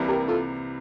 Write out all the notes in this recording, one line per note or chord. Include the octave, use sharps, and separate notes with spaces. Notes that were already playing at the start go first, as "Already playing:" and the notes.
Already playing: C2 C3 E3 G3 A#3
G4 A#4
F4 A4